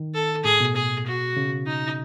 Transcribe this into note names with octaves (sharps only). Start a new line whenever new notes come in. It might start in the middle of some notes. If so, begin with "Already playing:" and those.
Already playing: D#3
A4
A2 G#4
B2
G#4
F#4
C#3
D#4